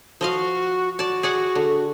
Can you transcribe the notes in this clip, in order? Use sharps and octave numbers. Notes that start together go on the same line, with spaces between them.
F3 F#4 D#5 F5
F#4 D5 A5
G#4 D5 F#5
D3